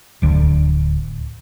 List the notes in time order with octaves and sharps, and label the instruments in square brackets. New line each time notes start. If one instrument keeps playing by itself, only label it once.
[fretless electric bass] D1 D2